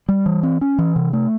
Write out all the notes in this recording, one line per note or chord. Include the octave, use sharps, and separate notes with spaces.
G3
E3
C4
C#4
E3
C3
A3